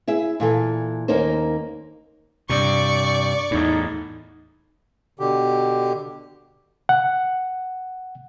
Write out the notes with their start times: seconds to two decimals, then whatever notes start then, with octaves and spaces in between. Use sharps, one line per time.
0.07 E4 G#4 E5
0.40 A#2 E3 A4
1.08 D#2 A#3 C#4 D#4 C5
2.50 G2 C3 D5 C#6
3.51 E2 A2 D#4
5.20 B2 D3 G4
6.89 F#5